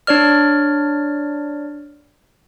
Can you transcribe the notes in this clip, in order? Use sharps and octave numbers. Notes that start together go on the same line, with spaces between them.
D4 C#5 D5 F6